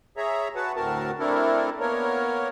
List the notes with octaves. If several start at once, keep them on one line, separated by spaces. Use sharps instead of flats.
G#4 C#5 E5 A#5
F#4 B4 F#5 A5
D2 A2 C4 F#4 A#4 A5
A3 C4 D4 E4 A4 A#4
A#3 B3 A#4 C#5